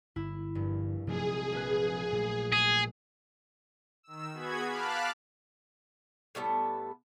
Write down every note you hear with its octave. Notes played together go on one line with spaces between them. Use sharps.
G1 E4
A#1 G2
A#1 C3 F3 F#3 G#3 A3 G#4
A#1 B4 F#6
A#2 F#3 A3
G#4
D#3 E6
B3 F#4 G#4 B5 G#6
F5 A5 B5 D6 F6 F#6
A2 G3 B3 A4